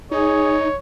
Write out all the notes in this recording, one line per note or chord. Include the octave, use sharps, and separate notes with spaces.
D#4 G#4 C#5